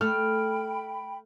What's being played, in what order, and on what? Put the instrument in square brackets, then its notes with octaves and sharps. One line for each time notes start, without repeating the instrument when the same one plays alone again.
[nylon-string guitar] A3 [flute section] G5 B5 [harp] F6